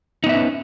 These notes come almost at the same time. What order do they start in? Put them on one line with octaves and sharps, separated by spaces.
D#4 B3 E5 B4 C#4